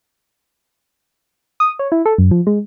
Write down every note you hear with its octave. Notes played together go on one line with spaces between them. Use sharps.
D#6
C#5
E4
A4
F#2
F3
G#3